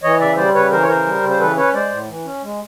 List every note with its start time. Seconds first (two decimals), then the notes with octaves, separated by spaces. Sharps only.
0.03 E3 C#5 D#5
0.20 C#3 D5 E5
0.37 G3 C5 D5
0.54 C#3 B4 C#5
0.71 E3 A#4 C5
0.82 C#5
0.88 C#3 A#4 C5
1.06 G3
1.23 C#3
1.30 C5
1.40 E3 A4 B4
1.57 C#4 B4 C#5
1.74 G#3 C5 D5
1.91 A2
2.08 E3
2.25 C#4
2.43 G#3